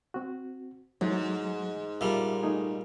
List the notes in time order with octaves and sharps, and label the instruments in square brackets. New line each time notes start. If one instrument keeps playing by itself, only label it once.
[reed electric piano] C4 F#4
[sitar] G#2 [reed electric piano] E3 F#3 A3
[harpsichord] A#2 G3 [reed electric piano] E5 A5
[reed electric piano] A3 D#4 G#4